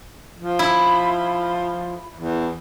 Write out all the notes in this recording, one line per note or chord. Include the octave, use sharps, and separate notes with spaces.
F3
E4
E2